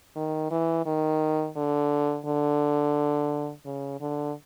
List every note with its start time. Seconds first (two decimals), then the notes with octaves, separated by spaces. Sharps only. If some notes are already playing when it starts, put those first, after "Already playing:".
0.16 D#3
0.51 E3
0.86 D#3
1.56 D3
2.25 D3
3.66 C#3
4.01 D3